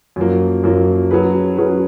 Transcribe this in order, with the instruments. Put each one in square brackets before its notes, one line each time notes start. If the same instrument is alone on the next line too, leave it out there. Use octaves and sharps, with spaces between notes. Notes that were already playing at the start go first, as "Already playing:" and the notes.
[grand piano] F#2 F3 A#3
F#2 F3 A#3
F#3 C#4 G#4 B4
F#3 C#4 G#4 B4